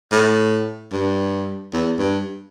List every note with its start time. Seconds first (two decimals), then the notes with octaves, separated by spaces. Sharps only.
0.12 A2
0.93 G2
1.73 E2
1.99 G2